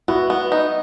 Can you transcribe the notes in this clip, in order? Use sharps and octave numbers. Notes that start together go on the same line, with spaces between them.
B3 E4 F#4
B3
D#4